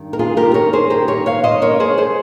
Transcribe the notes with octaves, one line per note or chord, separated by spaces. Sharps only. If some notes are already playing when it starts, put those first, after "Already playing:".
Already playing: G2 D#3 G3
A#4
F4 G#4
G4 A#4
A#4 C#5
G#4 C5
G4 A#4
A#4 C#5
C#5 F5
C5 D#5
A#4 C#5
G#4 C5
G#4 C5